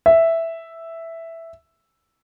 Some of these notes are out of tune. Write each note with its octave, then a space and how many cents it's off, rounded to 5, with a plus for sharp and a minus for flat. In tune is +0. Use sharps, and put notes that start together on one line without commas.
E5 +0